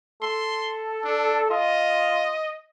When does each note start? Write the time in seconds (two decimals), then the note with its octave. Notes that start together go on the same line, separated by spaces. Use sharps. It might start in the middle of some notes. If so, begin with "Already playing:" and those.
0.22 A4 C6
1.04 D4
1.51 F4 D#5